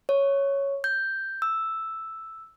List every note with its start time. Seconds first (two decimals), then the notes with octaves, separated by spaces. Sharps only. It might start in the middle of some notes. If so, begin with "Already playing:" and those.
0.09 C#5
0.84 G6
1.42 E6